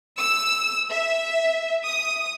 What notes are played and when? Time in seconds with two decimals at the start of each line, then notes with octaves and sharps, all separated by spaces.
0.18 E6
0.90 E5
1.86 D#6